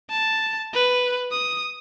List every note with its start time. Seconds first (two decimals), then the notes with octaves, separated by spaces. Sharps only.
0.10 A5
0.74 B4
1.31 D#6